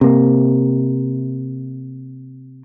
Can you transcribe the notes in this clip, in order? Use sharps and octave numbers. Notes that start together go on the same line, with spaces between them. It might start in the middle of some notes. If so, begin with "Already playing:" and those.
C3 A#3